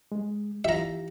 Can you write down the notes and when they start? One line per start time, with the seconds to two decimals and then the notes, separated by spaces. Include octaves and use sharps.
0.12 G#3
0.65 E3 F4 G4 E5 A#5